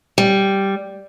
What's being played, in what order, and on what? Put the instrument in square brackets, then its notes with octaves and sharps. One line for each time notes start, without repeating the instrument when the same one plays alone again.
[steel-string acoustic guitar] G3